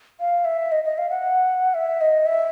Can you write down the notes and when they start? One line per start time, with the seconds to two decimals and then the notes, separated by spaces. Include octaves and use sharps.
0.20 F5
0.45 E5
0.72 D#5
0.84 D#5
0.98 F5
1.10 F#5
1.74 E5
2.01 D#5
2.26 E5